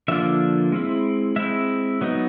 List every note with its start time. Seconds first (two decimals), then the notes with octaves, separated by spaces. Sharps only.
0.08 D3 F3 A#3 D4 F4 E5
0.72 G#3 C4 E4
1.36 G#3 C4 E4 E5
2.01 F#3 B3 D#4